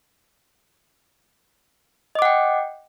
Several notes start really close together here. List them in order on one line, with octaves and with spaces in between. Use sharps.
D#5 D6 F#5 G5